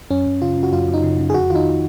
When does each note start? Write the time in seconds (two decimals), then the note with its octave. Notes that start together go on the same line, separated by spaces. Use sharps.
0.10 F#2 C#4
0.26 F#2
0.42 C#3 F4
0.58 C#3
0.63 F#4
0.72 F#2 F4
0.88 F#2
0.94 D#4
1.03 C#3
1.19 C#3
1.30 G#4
1.34 F2 F#4
1.50 D#3 F4
1.55 D#4